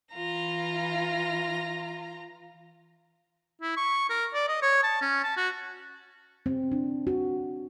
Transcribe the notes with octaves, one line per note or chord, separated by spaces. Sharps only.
E3 F4 A#5
E4
C#6
A#4
D5
D#5
C#5
A5
C#4
A5
F#4
C4
D4
F#4